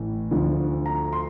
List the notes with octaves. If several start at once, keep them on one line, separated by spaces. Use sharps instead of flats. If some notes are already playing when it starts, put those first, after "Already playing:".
Already playing: A1 A2 E3 A3
D2 D3 F3
A#5
C6